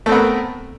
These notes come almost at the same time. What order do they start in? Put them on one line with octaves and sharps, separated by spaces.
A3 C4 B3 A#4